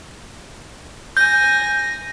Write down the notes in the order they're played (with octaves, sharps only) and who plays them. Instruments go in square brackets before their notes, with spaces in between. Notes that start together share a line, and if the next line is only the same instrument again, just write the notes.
[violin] G#5 A#6 [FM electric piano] G6